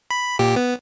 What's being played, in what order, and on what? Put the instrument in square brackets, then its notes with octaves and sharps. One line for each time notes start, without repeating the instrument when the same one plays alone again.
[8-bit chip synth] B5
A#2 G4
B3